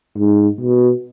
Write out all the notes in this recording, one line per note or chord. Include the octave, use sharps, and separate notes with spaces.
G#2
B2